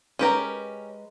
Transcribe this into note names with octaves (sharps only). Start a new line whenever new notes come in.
G#3 C#4 G4 A#4 B4 A#5